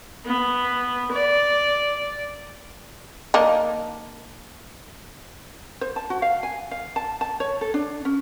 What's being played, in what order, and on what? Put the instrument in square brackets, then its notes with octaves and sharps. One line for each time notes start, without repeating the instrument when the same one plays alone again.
[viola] B3
D5
[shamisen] A#3 D4 D#4
[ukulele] C5
A5
F#4
F5
G#5
F5
A5
A5
C#5
A4
D4
C#4